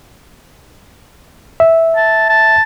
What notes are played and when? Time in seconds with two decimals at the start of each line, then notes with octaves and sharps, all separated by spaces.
1.60 E5
1.96 A5
2.29 A5